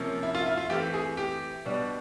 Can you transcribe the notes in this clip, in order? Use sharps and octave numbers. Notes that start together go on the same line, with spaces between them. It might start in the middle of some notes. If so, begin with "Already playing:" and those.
Already playing: C3 F3 A#3 C#4
E4
F4
E4
F4
E3 A3 C4 G4
G#4
G4
B2 G3 B3 D4